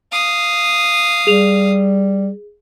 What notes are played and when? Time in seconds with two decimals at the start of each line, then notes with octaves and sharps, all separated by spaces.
0.12 F5 D#6
1.27 G3 G#4 F7